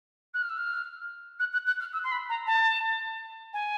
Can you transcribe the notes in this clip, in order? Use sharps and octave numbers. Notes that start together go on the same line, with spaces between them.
F#6
F6
E6
F6
F#6
F#6
F#6
F6
E6
C6
B5
A#5
A5
G#5